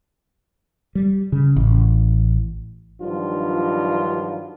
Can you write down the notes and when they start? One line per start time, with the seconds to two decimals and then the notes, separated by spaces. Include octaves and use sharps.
0.95 G3
1.32 C#3
1.56 A1
3.02 G2 D#3 F3 F#3 D4 F4